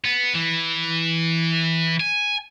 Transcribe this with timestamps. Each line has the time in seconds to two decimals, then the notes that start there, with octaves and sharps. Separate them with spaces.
0.05 B3
0.34 E3
2.00 G#5